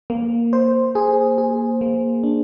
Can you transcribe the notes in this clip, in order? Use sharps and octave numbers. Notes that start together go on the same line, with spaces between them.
A#3
C5
G#4
G#4
A#3
D4